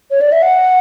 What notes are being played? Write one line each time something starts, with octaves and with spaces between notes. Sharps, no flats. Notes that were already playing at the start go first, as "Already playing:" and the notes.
C#5
D5
E5
F#5